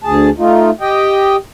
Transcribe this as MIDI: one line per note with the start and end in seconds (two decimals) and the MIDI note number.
0.04 0.30 38
0.04 0.30 68
0.04 0.30 81
0.38 0.70 57
0.38 0.70 63
0.38 0.70 65
0.81 1.36 67
0.81 1.36 75
0.81 1.36 79